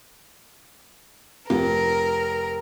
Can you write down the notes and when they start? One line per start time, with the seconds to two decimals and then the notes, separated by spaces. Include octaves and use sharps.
1.50 F1 A#4